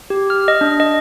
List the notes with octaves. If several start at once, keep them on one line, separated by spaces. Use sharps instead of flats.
G4
F6
D#5
D4
D#5